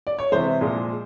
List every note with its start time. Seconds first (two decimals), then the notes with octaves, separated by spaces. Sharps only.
0.07 D5
0.19 C#5
0.32 C3 E3 G#3 C5
0.61 A#2 F3 G#3